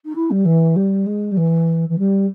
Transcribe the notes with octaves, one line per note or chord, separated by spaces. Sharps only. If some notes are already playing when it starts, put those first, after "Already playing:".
D#4
E4
G3
E3
G3
G#3
G3
E3
E3
G3